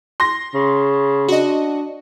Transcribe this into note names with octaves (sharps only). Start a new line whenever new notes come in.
C6 A#6
C#3
D4 F#4 D#5